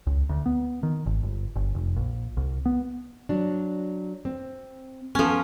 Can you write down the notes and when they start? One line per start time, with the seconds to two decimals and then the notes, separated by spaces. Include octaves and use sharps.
0.07 C#2
0.29 D2
0.46 B3
0.83 D#3
1.06 G#1
1.23 G1
1.56 G1
1.75 F1
1.96 A#1
2.37 C2
2.66 B3
3.29 F#3 D4
4.25 C4
5.15 F3 B3 C#4 A4